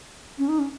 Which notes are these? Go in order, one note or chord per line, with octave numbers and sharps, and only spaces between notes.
C#4
D#4
C#4